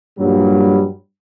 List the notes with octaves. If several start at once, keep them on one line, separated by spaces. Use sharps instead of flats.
G2 A#2 F#3 G3